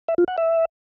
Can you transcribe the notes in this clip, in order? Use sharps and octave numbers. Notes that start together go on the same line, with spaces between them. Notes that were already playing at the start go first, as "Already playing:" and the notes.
E5
F4
F#5
E5